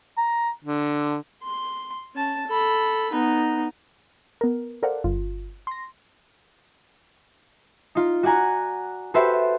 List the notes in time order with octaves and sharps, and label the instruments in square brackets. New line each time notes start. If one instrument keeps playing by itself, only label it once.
[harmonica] A#5
D3
[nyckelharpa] C6
C#4 A5
A4 B5
B3 D#4
[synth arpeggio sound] B3 A#4
A4 A#4 C5 D5 F5 F#5
G1 F4
C6 A#6
[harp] D#4 F4
F#4 D5 F#5 G#5 A#5
F#4 G4 A4 B4 C5 E5